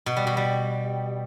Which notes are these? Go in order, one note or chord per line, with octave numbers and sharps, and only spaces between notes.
B2
G3
B2
G3